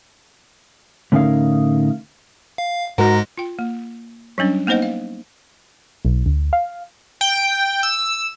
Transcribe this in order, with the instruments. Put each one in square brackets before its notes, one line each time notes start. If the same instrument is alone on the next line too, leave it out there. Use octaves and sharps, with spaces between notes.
[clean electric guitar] A2 D3 C#4 D#4 A#4 F5
[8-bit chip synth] F5
[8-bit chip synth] G#2 G#3 A#6 [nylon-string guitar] F#4 A#4
[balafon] F4 G5
A#3
F#3 G3 C#4 D4
A#3 B3 D#4 C5 D#5 F#5
F5
[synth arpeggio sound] B1
D2
F5
[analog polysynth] G5
E6